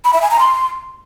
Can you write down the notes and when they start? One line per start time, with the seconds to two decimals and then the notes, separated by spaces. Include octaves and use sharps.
0.05 B5
0.13 E5
0.22 G#5
0.31 A#5
0.39 C6